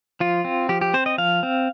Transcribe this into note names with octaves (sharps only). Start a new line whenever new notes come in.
F3 F4
C4
F3 G4
G4
C4 C5
D#5
F3 F5
C4